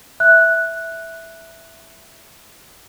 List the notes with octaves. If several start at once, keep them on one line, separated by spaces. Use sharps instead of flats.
E5 F#6